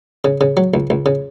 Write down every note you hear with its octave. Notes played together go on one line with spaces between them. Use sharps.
C#3
C#3
F#3
C#2
C#2
C#3